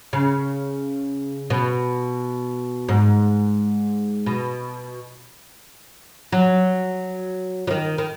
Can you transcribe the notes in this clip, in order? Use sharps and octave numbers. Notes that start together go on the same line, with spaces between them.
C#3
B2
G#2
B2
F#3
F#3
D#3
D#3